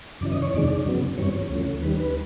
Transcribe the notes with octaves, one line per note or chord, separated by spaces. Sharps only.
F#2 C#3 E3 D5
D#5
C#5
F2 C3 D#3 G#3 D5
F#2 C#3 F#3 B3
G2 E3 G3 C4 C#5
D2 C#3 F3 A3 C#4
D#2 D#3 G3 B4
B4